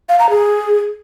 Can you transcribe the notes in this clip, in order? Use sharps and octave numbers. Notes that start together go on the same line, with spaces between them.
F5
A#5
G#4